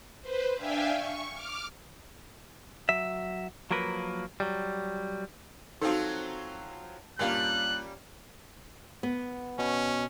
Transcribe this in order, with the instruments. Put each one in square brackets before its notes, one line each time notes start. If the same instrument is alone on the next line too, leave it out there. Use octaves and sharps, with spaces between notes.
[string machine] B4 C5
D4 E5 F5 G5 G#5
C#6
D6 F6
[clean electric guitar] F#3 E5
F3 F#3 A#3 A#4 B4
F#3 G3
[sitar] F3 F#3 C4 [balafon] D#4 F#4 [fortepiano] A4 F5
[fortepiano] G2 A#2 F5 [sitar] G3 A#3 C#4 [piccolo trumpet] F#6
[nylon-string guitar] B3
[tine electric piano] B2 [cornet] C#4